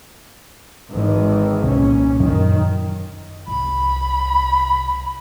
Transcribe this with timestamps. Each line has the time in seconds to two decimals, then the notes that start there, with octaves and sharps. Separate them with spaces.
0.91 G#1 D#3 E3
1.64 C2 A#2 C#4
2.20 F#2 D#3
3.48 C2 C3 B5